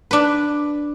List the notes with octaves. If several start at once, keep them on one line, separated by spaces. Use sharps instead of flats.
D4 B4